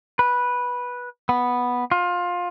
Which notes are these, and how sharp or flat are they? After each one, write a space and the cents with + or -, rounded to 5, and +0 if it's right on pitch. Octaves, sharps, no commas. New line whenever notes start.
B4 -10
B3 -5
F4 +20